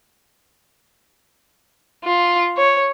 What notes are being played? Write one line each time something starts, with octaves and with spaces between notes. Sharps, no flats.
F4
C#5